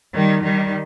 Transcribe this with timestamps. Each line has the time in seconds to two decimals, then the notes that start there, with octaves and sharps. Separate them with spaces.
0.13 D#3 G3
0.43 D#3 G3